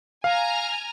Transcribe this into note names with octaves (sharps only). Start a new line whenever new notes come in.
F5 G#5 A#5 F6